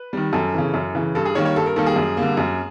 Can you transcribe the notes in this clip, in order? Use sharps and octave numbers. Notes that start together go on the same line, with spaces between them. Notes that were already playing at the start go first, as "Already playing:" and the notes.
Already playing: B4
D#3 G3
F#2 A4
C#3 E3
F#2
C#3 E3
G2 A4
G#4
D#3 G3 A#3 C#5
C#5
G2 A4
A#4
D#3 G3 A#3 A4
G#4
F#2
D3 G3 A#3
F#2